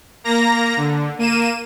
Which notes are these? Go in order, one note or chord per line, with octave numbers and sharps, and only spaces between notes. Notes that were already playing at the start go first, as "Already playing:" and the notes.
A#3 A#5 A#6
D3
A#3 D#7 E7